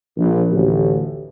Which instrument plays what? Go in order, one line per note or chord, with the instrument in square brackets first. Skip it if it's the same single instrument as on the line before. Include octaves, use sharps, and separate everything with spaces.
[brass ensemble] A#1
A1 D2 G4